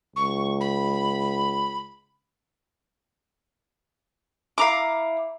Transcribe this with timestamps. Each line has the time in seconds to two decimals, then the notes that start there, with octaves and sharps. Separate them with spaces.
0.16 C#2 C#6
0.60 B5
4.58 E4 F5 A#5 D6